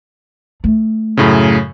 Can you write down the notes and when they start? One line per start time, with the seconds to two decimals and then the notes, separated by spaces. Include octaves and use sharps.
0.64 A3
1.17 F#2 A2 C#3